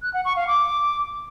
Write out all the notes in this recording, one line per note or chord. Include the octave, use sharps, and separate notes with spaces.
F#6
F#5
C#6
F5
D6